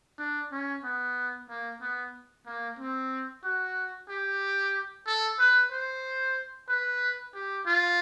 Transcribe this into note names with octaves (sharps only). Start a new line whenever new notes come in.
D4
C#4
B3
A#3
B3
A#3
C4
F#4
G4
A4
B4
C5
B4
G4
F4